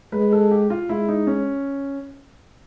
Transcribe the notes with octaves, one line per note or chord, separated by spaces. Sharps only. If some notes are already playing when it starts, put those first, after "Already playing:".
G#3 B4
A4
G4
F4
G#3 E4
D#4
C#4